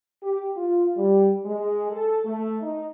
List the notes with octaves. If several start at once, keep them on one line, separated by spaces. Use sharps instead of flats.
G4
F4
G3
G#3
A4
A3
D#4